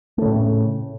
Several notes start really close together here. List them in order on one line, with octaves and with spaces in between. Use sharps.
A3 C#3 A2